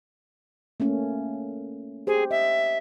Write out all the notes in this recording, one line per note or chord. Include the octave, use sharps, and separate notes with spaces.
A3 A#3 C#4
G4 G#4 C5
D#5 E5